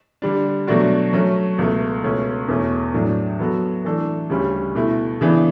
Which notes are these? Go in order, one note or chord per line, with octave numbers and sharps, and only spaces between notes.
D3 G3 D4
B2 F#3 A3 D4 F#4
F#3 A3 C#4
C#2 B2 A3
C#2 B2 A3 C#4
E2 B2 A3 C#4
A2 F#3 A3 D4
F#3 B3 F#4 A4
E3 A3 D4 A4
D2 C#3 G3 C#4
B2 A3 E4
C#3 E3 B3 D4